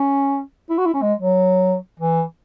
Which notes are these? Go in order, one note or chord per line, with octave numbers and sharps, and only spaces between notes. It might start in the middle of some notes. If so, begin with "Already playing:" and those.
Already playing: C#4
E4
F#4
E4
C#4
G#3
F#3
E3